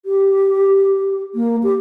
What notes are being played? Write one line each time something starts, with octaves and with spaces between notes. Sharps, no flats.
G4
A#3
G4